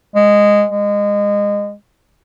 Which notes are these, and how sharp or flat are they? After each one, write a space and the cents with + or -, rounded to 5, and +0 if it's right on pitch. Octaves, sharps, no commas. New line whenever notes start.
G#3 -10
G#3 -25